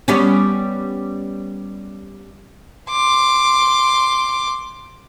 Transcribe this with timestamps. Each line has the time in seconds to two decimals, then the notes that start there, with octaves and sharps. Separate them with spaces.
0.08 G3 B3 C#4
2.90 C6 D6